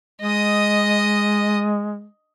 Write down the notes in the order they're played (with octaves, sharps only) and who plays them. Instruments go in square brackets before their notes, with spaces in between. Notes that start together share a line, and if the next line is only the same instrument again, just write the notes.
[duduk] G#3 [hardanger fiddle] D#5 D#6